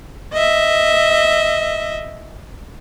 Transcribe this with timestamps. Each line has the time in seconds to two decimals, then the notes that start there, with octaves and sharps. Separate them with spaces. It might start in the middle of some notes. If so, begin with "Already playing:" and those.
0.33 D#5 E5